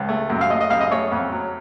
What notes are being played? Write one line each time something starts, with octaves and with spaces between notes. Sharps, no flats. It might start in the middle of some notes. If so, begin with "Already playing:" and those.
Already playing: C#2
A3
F#2
F5
A3 D#5
D#5
F#2 F5
D#5
A3 C#5
F2
F#3